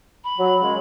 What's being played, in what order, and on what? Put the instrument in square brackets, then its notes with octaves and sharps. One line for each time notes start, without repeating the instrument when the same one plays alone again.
[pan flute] B5
[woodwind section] F#3
F#2 C#3 G#3